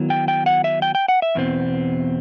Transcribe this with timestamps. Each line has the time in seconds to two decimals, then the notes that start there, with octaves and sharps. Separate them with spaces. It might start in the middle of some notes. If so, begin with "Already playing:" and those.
Already playing: D#3 F#3 B3 E4
0.10 G5
0.28 G5
0.46 F#5
0.64 E5
0.82 G5
0.95 G5
1.08 F#5
1.22 E5
1.35 E2 B2 C4